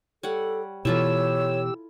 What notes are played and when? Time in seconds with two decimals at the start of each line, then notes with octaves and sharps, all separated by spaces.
0.23 G3 A4 C#5 F#5
0.85 B2 E3 E4 F4 G4 A4 C#5 E6